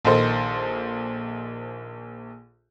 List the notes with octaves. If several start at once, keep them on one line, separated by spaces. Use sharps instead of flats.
A#1 D#3 A4 C5